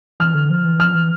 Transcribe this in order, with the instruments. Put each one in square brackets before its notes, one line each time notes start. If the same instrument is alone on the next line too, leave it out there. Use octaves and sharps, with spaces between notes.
[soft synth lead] E3 [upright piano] F6
[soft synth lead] D3
F3
E3
[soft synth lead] F3 [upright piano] F6
[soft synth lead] E3